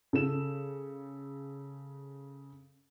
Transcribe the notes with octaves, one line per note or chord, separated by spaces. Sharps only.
C#3 A4 E7